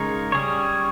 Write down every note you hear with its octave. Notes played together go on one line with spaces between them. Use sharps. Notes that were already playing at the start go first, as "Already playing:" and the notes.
Already playing: C#3 G#3 D#4 A#4 C#5
G3 C#4 G#4 C#5